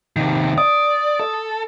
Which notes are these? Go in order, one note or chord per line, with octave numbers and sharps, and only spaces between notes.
C3 D#3
D5 D#6
A4